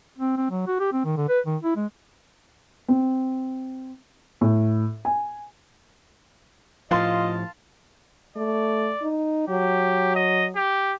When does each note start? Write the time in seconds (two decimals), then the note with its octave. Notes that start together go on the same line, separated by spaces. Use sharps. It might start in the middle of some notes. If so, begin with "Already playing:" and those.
0.18 C4
0.37 C4
0.51 F#3
0.67 F#4
0.80 G4
0.93 C4
1.05 D#3
1.17 D3
1.29 B4
1.46 D#3
1.63 E4
1.76 G#3
2.88 C4
4.41 A2
5.05 G#5
6.91 A2 F3 F4 D#5 F5 A5 C6
8.36 A3 D5
9.02 D#4
9.48 F#3 G4
10.15 D#5
10.55 G4